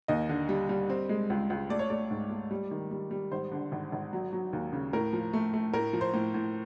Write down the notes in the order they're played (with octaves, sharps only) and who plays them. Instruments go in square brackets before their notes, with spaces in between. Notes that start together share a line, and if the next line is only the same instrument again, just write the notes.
[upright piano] D#2 D#5
D3
G3
G3
C4
G#3
C#2
C#2
A3 D5
C#5
A3 D5
G#2
A3
G3
D#3
G3
G3
G#1 C5
D3
G#1
G#1
F#3
F#3
D#2
C#3
A2 A#4
F3
A3
A3
A2 A#4
F3
C5
A2
A2